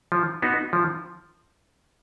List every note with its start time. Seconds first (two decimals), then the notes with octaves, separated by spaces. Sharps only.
0.12 F3
0.42 B3 D#4 F#4
0.73 F3